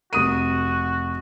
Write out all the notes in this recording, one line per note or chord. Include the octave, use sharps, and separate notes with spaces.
F1 F#4 D#6 D#7